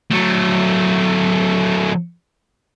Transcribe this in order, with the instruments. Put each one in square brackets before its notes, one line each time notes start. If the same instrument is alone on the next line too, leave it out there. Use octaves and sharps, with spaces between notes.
[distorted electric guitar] F#3 A3